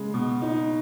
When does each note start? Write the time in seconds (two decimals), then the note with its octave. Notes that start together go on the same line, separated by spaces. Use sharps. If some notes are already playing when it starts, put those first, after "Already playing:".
Already playing: C#3 G#3
0.14 B2
0.42 D#4